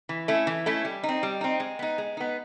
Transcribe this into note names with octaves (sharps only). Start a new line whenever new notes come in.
E3
A3 C#4 E4
E3
A3 C#4 E4
G3
D#4
C4
G3
C4 D#4
G#3
B3 D#4
G#3
B3 D#4